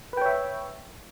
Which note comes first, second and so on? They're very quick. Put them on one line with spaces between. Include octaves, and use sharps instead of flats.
B4 G5 C#5 E5